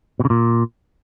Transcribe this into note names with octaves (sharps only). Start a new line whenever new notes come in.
B2
C#3
A#2